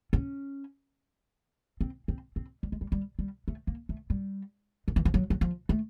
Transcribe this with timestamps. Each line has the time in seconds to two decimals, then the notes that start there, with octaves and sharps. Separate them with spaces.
0.13 C#4
1.81 C4
2.08 C4
2.36 C4
2.63 G3
2.72 G#3
2.81 G3
2.92 G3
3.19 G3
3.48 A3
3.67 A#3
3.89 A3
4.10 G3
4.88 D#3
4.96 E3
5.05 F3
5.14 F#3
5.30 F#3
5.41 F3
5.69 A3